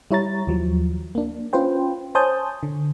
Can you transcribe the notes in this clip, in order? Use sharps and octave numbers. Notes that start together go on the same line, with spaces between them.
G3 E4 C#5 A#5 A6
D#2 F3 F#3
A#3 D4
C#4 F4 B4 C5 G5
C5 C#5 G#5 A5 D#6 G6
D3